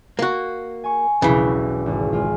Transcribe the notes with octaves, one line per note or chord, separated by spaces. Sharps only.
A#3 F#4
G#5 C#6
E1 B1 C#3 E3
G#1
G#3 F4